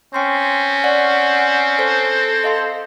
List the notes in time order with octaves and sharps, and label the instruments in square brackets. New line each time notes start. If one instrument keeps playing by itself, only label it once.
[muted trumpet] C4 [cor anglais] C#4 [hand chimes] G5 C6
[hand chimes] D5 [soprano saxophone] F#5
[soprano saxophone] A4 [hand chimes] C5
[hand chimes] D#5 F5 C6